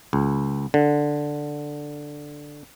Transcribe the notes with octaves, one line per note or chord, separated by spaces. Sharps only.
C#2
D3